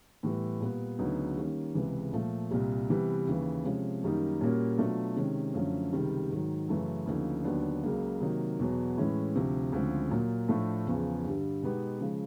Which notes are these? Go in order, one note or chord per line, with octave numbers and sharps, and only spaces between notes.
A2 E3 G3 B3
A#2 G3 B3
D2 C#3 F#3 B3 D#4
D#3 G3 A#3 C#4
C#2 C3 E3 G#3
A#2 F3 A3
C2 A#2 G3
C3 E3 G3 B3
D#2 C#3 E3
C3 F3 G#3 C#4
F#2 D#3 G3 A#3 D#4
A#2 G3 A#3 C#4 F#4
B2 F#3 A3 D4 F4
C3 D#3 G#3 C#4
F#2 D3 F3 A3 C#4
C#2 C3 D#3 G3
G#2 D#3 F#3
F#2 C#3 E3 A3
D2 C#3 F3 A#3 D#4
D#2 D3 F#3 B3 D4
C#2 C#3 F#3 A#3
C3 D#3 F#3 A#3 D#4
E2 B2 F#3
A2 E3 G#3 C#4 E4
D2 C3 F3
D2 C#3 F3 G#3 C4
A#2 F#3 A#3
A2 F3 A3 D4
E2 C#3 F3
G2 D3 G3
B2 G#3 B3 D#4 G4
C#3 F3 G#3